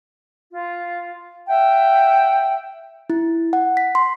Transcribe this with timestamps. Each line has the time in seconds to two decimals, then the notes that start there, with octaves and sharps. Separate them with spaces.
0.51 F4
1.47 E5 F#5 G5
3.10 E4
3.53 F#5
3.77 B6
3.95 C6